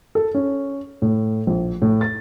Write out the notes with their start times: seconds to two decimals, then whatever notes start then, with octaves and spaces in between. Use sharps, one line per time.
0.15 A4
0.35 C#4
1.02 A2
1.47 A#1
1.82 A2
2.01 A6